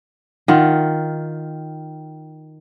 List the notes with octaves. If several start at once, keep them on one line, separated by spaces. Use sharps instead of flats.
D#3 F4 F#5